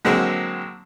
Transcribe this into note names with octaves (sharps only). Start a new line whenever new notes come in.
D3 F#3 G#3 A#3 C4